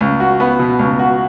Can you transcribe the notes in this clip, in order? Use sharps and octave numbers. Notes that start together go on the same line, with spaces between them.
C#2
F#4
B3
B2
C#2
F#4